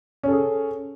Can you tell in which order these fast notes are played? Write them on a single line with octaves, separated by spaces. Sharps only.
C#4 A4 G#4